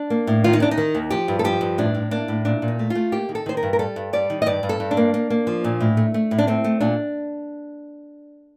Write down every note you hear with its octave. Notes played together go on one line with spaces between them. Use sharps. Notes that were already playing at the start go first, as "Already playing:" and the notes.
Already playing: D4
A#3
A2
D#3 F4
D#4
D#2 D4
D#4
D#3
D#2
F3 G4
G2
A4
F3 G4
G2
A2 D4
A2
A#3 D4
A2
A#2 D4
A#2
D#4
A3
F4
A3
A#3 G4
D#3
A4
D#3 C5
A#4
G2
A#4
G3 A4
G2
G3 D5
D#3
D#5
G2 D5
G2
A4
G2
D4
A#3
A#3
A#3
F3
A#2
A2
A3
A3
A2
D4
A3 C4
A3
A#2 D4